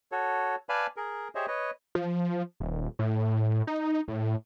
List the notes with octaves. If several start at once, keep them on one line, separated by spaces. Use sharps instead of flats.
F#4 A4 C#5
B4 D5 F5 G#5 A5 B5
G#4 A#4
G4 G#4 C5 C#5 D#5 E5
B4 C#5 D#5
F3
D#1
A2
D#4
A2